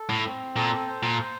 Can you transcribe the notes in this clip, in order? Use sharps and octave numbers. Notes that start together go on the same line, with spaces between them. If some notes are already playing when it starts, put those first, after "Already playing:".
Already playing: A4
A2
C4
A#2 A4
C5
A#2
C5